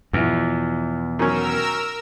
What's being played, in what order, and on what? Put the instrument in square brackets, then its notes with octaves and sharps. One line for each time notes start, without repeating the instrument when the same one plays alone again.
[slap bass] E2 [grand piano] B2 F3 E4
[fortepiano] D#3 F#3 C#4 [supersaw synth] A#4 E6